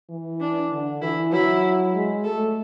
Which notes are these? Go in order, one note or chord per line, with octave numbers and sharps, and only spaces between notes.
E3
D4
D3
E3 E4
F#3 E4
G#3
A3 A4